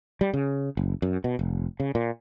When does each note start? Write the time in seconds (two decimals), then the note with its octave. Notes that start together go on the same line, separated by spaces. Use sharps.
0.21 G3
0.34 C#3
0.77 F#1
1.02 F#2
1.24 B2
1.39 F1
1.80 C#3
1.95 A#2